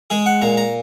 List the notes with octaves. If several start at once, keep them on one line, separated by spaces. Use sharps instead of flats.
G#3 G#4
F#5
A#2 A#5
A#5